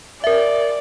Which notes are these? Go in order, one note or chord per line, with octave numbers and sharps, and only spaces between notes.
A#4 D5 E5